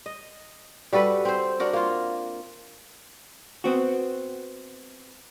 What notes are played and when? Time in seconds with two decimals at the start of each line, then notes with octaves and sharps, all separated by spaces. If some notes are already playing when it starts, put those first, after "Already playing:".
0.06 D#5
0.93 G3 F#4 A4 B4
1.25 C4 C5
1.60 D4 F#4 A#4
1.73 A#3 F4
3.64 B3 C4 F#4